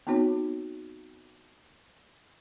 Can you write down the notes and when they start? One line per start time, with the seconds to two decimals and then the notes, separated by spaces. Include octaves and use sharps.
0.07 B3 C4 D#4 F#4 C#5